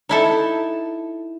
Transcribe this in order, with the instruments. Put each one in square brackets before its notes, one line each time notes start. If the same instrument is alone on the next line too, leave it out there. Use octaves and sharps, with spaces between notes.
[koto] D#4 E4 A4